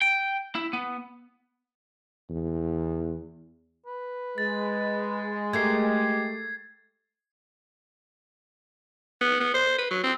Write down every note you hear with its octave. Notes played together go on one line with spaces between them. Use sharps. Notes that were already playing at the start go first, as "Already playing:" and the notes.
G5
E4
B3
E2
B4
G#3 A6
A3 G4 A#4 G#6 C7
B3
B3
C5
B4
F#3
C4